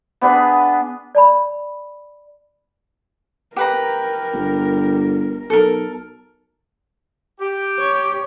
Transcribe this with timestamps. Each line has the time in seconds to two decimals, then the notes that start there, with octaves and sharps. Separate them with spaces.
0.21 B3 D4 G#4 B4
1.15 D5 A5 B5
3.56 G4 A#4 B4 A#5
4.33 G1
5.50 B1 A4 A#4
7.40 G4
7.79 C#5